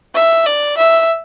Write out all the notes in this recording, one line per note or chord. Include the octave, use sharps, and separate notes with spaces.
E5
D5
E5